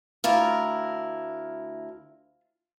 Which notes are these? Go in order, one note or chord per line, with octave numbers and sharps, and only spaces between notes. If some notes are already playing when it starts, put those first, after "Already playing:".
D2 E4 F4 A#4